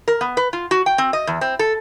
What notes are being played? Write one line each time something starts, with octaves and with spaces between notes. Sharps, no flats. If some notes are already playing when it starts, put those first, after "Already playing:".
A#4
B3
B4
F4
F#4
G5
C4
D#5
E2
C4
A4